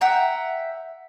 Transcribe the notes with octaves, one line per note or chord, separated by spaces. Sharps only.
E5 F#5 G5 A#5